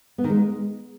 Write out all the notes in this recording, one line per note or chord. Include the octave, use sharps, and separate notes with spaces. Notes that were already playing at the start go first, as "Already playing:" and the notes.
B3
D#3
G#3